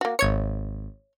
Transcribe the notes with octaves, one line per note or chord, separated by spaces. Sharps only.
A#3 F#4
G#1 C#5 G#6 C#7